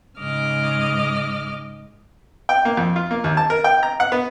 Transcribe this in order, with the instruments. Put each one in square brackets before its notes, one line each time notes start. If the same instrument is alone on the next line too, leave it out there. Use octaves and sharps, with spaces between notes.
[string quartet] G#2 C#3 D#5 D6 F6
[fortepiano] G5
A#3
F2
F4
A#3
D#2
A5
A#4
G5
A#5
F#5
B3